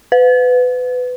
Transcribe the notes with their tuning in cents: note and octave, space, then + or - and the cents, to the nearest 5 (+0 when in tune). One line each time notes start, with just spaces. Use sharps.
B4 +25